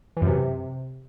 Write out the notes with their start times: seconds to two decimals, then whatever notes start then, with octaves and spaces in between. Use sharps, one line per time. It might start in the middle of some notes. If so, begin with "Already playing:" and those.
0.17 E3
0.22 F#2
0.27 C3